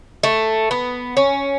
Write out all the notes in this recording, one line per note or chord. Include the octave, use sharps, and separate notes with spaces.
A3
B3
C#4